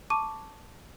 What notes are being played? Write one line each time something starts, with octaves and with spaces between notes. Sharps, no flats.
A5 C#6 D6 D#7